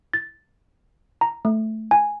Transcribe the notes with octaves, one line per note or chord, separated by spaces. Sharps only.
A6
A#5
A3
G#5